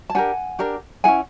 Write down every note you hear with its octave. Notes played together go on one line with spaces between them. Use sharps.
A5
D4 G4 A#4 F#5 G#5
D4 G4 A#4
C#4 E4 G#4 F#5 G#5